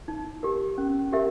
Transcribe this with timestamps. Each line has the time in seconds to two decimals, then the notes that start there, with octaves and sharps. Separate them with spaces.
0.08 D#4
0.43 G4 A#4
0.78 C#4
1.12 G4 A#4 E5